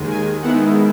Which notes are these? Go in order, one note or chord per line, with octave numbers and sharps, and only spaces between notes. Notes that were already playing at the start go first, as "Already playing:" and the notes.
Already playing: D#2 D#3 G#3
G#5
D#3 G#3 B3 E4 F#5